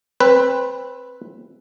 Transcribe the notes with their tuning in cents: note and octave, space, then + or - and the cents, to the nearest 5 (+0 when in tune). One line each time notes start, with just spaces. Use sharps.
C4 +20 B4 +0